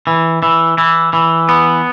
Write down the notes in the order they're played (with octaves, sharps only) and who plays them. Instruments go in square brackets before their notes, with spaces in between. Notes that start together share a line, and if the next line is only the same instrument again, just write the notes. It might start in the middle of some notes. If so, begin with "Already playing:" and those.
[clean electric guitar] E3
E3
E3
E3
B3